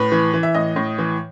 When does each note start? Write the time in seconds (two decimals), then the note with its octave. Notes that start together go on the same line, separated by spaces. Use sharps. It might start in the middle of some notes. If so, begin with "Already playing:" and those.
Already playing: A2 B4
0.12 E3
0.34 E3
0.43 E5
0.54 A2 D#5
0.76 A2
0.98 E3